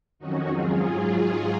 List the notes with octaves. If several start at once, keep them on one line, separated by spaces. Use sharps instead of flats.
F2 D#3 F#3 C#4 D#4 F#4
G#2 F#3 C4 F4 G#4